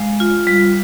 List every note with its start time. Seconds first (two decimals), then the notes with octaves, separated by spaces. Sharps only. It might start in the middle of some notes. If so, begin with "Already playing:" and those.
Already playing: G#3 F5
0.20 F4
0.47 G3